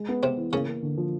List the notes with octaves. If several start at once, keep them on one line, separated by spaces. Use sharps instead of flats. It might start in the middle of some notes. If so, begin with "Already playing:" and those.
Already playing: G#3
B3
C3 B3 C4
E3
C#3 A#3 C#4
A#3
D3
F3